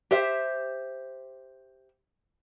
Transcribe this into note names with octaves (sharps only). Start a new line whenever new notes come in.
G4 C5 E5